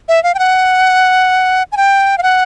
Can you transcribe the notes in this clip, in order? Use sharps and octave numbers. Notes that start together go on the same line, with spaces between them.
E5
F5
G5
F#5
G#5
G5
F5
F#5